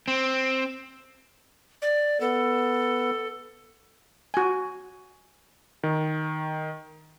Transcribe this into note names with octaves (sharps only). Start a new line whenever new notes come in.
C4
D5
B3 A4
F#4 G#5
D#3